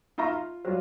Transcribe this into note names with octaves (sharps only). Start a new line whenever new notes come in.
D#4 F4 E5 A#5 B5 C#6
F4
F#3 G3 F4